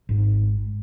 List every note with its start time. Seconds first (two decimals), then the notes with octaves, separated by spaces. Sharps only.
0.09 G#1 G#2